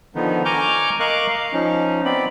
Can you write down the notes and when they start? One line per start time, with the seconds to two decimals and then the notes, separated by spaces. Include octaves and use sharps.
0.15 D3 D#3 F3 B3 D#4
0.45 G#5 A#5 C#6 D6 F6 G6
1.00 A#4 D#5 F5 C#6 D6 F#6
1.28 F5
1.53 F3 C#4 D#4
2.05 B3 C4 D5 B5